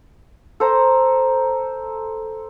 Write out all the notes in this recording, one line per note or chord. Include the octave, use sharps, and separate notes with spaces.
A4 C5 A#5